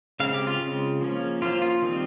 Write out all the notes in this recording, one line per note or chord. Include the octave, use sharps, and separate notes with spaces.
C#3 G#3 C4 F5
G4
F4
C#3 G#3 C4
F3 A#3 C#4
F3 A#3 C#4 F4
F4
D#3 G3 C4